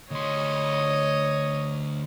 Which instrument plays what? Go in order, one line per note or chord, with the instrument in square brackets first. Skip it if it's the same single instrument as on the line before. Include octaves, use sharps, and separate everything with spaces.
[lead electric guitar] D2 C6 [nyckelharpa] C#5 D#5